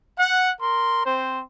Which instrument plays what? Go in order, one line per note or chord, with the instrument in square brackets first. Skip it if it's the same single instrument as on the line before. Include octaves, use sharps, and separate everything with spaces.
[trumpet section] F#5
A#4 C6
C4 C5